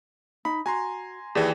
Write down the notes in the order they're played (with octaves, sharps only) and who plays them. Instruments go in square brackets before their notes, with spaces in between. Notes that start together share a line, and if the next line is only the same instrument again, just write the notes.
[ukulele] D#4 [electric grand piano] B5
[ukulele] F#4 [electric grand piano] G#5 A#5 C6
[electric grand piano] D#2 E3 [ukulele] G4 G#4 D5